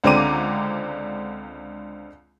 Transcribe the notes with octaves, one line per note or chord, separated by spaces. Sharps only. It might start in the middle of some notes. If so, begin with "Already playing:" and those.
C#2 D3 C4 A#5 D6 D#7